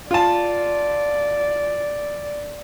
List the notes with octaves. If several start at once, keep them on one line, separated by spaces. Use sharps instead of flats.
F4 D5 A5